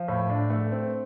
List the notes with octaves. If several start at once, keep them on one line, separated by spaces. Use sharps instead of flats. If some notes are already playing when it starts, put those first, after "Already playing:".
Already playing: F3
A2
D4
A3
C4